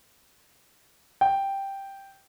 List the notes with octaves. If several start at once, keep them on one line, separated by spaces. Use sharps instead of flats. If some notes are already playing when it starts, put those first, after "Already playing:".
G5